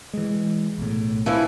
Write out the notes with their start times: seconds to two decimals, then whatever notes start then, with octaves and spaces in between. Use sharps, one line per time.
0.14 E3 G#3
0.78 B1 A2
1.26 E3 F3 E4